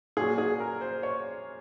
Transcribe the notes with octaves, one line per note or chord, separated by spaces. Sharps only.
A#2 F#3 G#4
G#4
A#4
C5
C#5